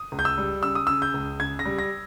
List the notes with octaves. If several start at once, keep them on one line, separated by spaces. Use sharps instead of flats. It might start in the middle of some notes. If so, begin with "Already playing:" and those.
Already playing: D#6
C#2
G6
E6
G3
C#3 E6
D#6
C#3 E6
G6
C#2
C#3 G#6
A#6
G3
A#6